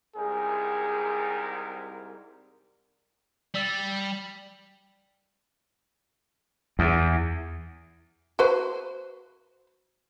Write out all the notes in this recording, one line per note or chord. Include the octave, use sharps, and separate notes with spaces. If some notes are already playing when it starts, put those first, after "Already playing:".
C2 G#2 G#4 A#4
G3 D5 E6 A6
E2
F#4 B4 C5